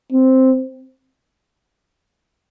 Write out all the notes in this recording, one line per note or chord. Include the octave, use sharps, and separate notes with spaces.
C4